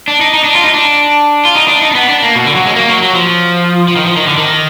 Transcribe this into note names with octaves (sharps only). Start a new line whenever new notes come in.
D4
D#4
D#4
D4
F4
D#4
D4
F4
D#4
D4
D#4
D4
B3
D4
A#3
B2
D3
F#3
G#3
A#3
F#3
F#3
F3
F3
D#3
F3
D#3
D3
D#3